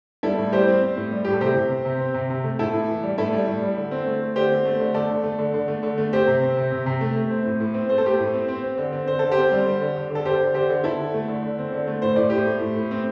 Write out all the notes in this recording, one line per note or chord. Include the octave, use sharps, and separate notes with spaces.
G3 E4 A4
A2
G3 G4 C5
C4
C4
A2
G3
A2 G4
A4
C3 G4 C5
C3
C4
C3
C4
C3
C3
A3
A2 E4 A4
A2
E3
G3
A2 E4 A4
G3
A2
G3
D3
C4
A3
A3
D3 G4 C5
C4
A3
D3
A3 A4 D5
D3
A3
D3
D3
A3
D3
A3
C4 G4 C5
C3
C4
C3
C3
C3
A3
A3
C4
A2
A2
C4
A3 C5
A4
A3 G4 C5
A2
C4
C4
C4
D3
C4
D3 C5
D3 A4
G4 C5
C4
G3
D3
D3
D3
D3 A4
D3 G4 C5
D3
D3 G4 C5
D3
D3 E4 A4
D3
A3
D3
D3
C4
D3
A3
A2 C5
A2 D5
A2 G4 C5
A3
A2
A2
C4